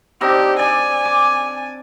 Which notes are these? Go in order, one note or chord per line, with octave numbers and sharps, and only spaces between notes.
C4 D4 D#4 G4
D5 G#5
D6